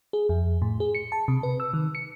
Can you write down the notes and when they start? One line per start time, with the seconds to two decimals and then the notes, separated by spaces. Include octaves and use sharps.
0.13 G#4
0.29 F2
0.62 A2
0.80 G#4
0.95 C#7
1.12 A5
1.28 C3
1.43 B4
1.60 E6
1.73 D#3
1.95 C#7